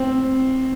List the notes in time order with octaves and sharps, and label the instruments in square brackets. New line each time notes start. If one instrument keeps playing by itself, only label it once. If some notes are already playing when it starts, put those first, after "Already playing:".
Already playing: [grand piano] C4